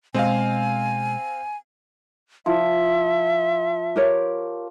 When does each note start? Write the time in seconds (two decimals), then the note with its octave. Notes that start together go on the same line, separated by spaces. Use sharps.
0.14 B2 G#3 C4 D#5 F5 G#5
2.46 F3 E4 E5
3.96 G4 A#4 C#5